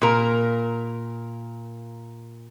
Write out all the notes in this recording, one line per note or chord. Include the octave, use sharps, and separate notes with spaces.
A#2 A#4